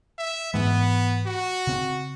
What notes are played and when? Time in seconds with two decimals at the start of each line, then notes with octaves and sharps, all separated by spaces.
0.18 E5
0.54 G#2 E3 G#3 B3
1.26 F#4
1.67 C#3 C4